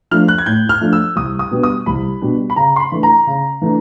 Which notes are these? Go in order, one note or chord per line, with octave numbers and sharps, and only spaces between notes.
F3 A3 D4 F6
F#6
G#6
A2 G6
F6
F3 A3 D4
E6
C2 D#6
D#6
B2 G3 B3 D4
D#6
C2 B5
B2 G3 B3 D4
B5
C#3 A#5
C6
B5
E3 A3 D4
A#5
C#3
E3 A3 D4